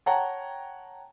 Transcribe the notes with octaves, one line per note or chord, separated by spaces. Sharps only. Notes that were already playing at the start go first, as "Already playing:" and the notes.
C#5 F#5 G5 A5 A#5